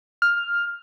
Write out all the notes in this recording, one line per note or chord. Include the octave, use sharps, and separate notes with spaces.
F6